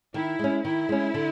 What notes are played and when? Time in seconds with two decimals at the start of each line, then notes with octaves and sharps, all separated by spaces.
0.14 D#3 E4
0.39 G#3 C#4
0.65 D#3 E4
0.89 G#3 C#4
1.14 D3